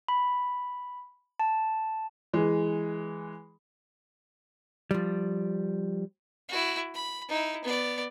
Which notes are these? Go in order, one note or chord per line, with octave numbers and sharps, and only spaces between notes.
B5
A5
E3 G#3
F3 G3
E4 F#4
B5
D#4 E4
B3 D5